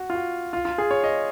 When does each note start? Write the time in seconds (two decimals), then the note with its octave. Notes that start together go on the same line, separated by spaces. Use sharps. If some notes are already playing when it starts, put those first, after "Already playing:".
Already playing: F#4
0.10 F4
0.15 F#4
0.53 F4
0.65 F4
0.78 G#4
0.91 C#5
1.04 D#5